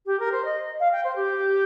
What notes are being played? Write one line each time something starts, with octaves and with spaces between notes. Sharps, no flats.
G4
A#4
C5
D#5
F5
G5
C5
G4